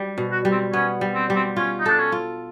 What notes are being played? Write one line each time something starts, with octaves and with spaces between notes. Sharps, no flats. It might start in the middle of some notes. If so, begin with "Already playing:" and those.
Already playing: G3
B2
F#4
G3
C4
B3 C#4
G3
C4
G3
C4
C#4 F4
D#4
D4 A4
C#4
F4